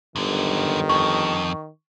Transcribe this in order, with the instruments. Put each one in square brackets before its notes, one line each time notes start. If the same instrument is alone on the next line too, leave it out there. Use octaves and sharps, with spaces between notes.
[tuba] G1 [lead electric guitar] F#2 D3 [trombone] D#3
[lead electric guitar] F2 [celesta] C#6